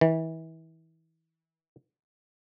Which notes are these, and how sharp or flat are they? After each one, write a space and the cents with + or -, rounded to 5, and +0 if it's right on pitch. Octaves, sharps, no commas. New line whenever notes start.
E3 -30